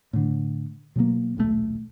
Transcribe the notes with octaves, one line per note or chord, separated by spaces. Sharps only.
A2 D3
B2 F#3 G3 A#3
D#1 B1 B2 A3